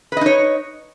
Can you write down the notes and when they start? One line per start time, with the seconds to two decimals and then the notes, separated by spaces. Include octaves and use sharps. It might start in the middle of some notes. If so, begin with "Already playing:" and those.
0.12 B4
0.17 D#5
0.21 D#4
0.26 C#5